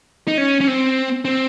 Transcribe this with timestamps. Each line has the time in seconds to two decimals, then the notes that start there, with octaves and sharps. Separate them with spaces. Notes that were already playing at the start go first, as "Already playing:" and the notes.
0.28 D#4
0.38 C#4
0.61 C#4
0.68 C4
1.25 C4